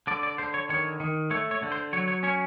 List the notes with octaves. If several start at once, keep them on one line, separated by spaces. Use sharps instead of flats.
D3 D5
D5
D3 C5
C#5
D#3 C#5
D#3
A3 C#5
C#5
D3
C5
F#3 C#5
C#5
C#4 C#5